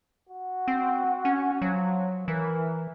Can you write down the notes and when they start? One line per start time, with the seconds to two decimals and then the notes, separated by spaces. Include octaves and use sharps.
0.29 F#4
0.68 C4
1.25 C#4
1.62 F3 F#3
2.28 E3 A#4